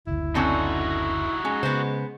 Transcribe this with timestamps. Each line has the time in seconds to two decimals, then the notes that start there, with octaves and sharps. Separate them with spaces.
0.07 F#1 D2 E4
0.35 D3 C4 C#4 D#4 F#4
1.45 G#3 C#4
1.63 C#3 B3 C5